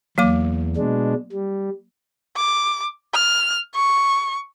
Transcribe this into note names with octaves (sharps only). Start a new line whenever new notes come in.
E2 F#3 A#3 D6
B2 G#3 D4
G3
D6
F6
C#6